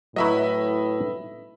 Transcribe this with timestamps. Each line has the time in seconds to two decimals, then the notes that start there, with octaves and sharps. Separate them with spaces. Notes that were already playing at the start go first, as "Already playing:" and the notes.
0.16 A2 F#3 E4 B4 D#5 E5 B5